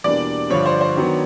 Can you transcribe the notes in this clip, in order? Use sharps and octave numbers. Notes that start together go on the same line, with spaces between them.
E2 B2 G3 A#3 D4 D5
G2 D3 F3 C#5
C5
C5
D#3 F#3 B3 D4